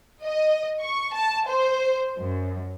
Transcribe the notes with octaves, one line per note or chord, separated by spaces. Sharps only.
D#5
C#6
A5
C5
F#2